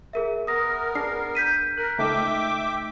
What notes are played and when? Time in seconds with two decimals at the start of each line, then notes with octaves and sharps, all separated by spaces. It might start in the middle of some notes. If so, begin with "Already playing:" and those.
0.13 G#4 A#4 E5
0.47 B3 A#4 D#6 A#6
0.95 D4 G#4 C7
1.35 G6 B6 D#7
1.78 A#4 F#6
1.98 C#2 A3 D#4 E5 G5 D6